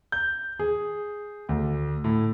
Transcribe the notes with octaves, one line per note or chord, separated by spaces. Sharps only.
G6
G#4
D2
A2